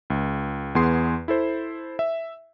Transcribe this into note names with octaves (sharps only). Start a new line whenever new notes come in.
C#2
E2 B3 G#4 C6 C7
E4 A4 C5
E5